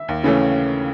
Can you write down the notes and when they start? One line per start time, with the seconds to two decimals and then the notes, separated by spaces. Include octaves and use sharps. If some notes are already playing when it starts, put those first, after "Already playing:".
Already playing: E5
0.08 D#2
0.24 C#3 E3 A3 C#4